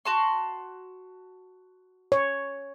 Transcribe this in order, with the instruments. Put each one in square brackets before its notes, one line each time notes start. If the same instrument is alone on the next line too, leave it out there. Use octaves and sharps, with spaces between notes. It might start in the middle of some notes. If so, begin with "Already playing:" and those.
[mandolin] F#4 A5 C6
[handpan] C#5